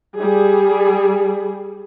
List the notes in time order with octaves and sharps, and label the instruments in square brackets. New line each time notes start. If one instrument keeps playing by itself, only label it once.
[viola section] G3 G#4